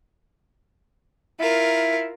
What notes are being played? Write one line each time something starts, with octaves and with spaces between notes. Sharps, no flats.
E4 F4 A#4